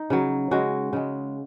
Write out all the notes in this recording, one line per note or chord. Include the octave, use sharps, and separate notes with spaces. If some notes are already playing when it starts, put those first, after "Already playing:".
Already playing: D#4
C#3 F#3
C#3 G#3 F#4
C#3 G#3